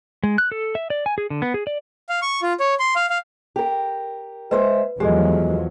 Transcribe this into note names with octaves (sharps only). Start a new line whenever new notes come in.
G#3
F#6
A4
E5
D5
G#5
G#4
D3
B3
G#4
D5
F5
C#6
F4
C#5
C6
F5
F5
G4 A#4
G#3 B4 C5 E5
E2 F3 F#3 G#3 G4 A4 D#5